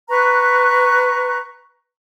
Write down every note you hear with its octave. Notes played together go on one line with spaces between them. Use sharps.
B4 A#5 C#6 F#6